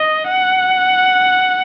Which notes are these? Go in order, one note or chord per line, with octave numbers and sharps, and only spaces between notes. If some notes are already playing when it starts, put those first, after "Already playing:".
Already playing: D#5
F#5